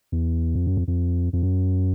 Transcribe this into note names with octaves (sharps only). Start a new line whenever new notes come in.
E2
F2
F#2
F2
F2
F2
F#2